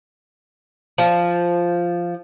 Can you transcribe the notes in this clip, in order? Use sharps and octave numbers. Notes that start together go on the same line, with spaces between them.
F3